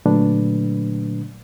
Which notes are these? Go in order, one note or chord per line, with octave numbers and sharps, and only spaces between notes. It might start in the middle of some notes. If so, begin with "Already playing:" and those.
A#2 D3 F#3 A3 D4 B4